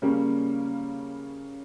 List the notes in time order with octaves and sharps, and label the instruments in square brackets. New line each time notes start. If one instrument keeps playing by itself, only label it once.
[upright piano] C#3 G3 A#3 C#4